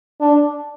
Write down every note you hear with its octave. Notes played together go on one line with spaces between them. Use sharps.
D4